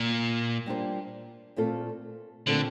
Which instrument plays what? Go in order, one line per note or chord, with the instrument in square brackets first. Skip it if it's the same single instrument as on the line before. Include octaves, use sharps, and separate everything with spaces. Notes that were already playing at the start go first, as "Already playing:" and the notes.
Already playing: [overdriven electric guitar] A#2
[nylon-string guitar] G3 A#3 D4 F4 C5
A#2 A3 C4 F4 A4
[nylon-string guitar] A#2 A3 C4 F4 A4 [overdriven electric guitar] D3